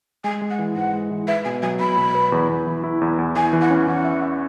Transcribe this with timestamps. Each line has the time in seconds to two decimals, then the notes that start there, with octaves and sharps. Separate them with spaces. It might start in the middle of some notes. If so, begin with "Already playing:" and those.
0.24 G#3 G#5
0.42 G#3
0.50 F#5
0.59 E3
0.76 G#2 F#5
0.93 G#3
1.10 E3
1.28 B4 E5
1.45 B2 G#5
1.62 F#3 G#5
1.80 B2 B5
1.97 B2
2.15 B4
2.32 E2
2.49 E2
2.67 E3
2.84 E4
3.01 E2
3.19 E2
3.36 E3 G#5
3.53 E3
3.61 F#5
3.70 C#4
3.87 E3 F#5
4.04 E5
4.22 E5